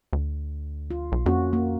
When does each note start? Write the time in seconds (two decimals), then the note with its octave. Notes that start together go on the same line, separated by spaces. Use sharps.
0.13 D2
0.91 F4
1.12 B1
1.26 F2 A#3 C#4 F#4
1.53 A#3